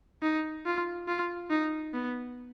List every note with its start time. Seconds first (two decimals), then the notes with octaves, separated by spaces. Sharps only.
0.22 D#4
0.66 F4
1.08 F4
1.50 D#4
1.94 B3